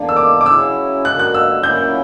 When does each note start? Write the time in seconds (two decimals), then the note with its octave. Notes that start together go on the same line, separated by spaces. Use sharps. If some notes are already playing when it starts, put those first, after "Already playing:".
Already playing: E2 D3 A#3 D4
0.09 E6
0.16 D6
0.41 D6
0.46 C#3 F#3 C#4 E4 E6
1.05 D3 F#3 A#3 F#6
1.19 F#6
1.34 E6
1.63 A#2 F#3 A#3 C#4 E4 G6